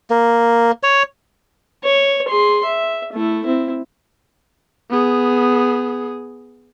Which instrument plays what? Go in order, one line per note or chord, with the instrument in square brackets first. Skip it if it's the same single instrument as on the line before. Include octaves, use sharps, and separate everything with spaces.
[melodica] A#3
C#5
[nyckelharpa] C#5
G#4 C6
E5
A3 E4
C4 E4
[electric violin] B3 G#4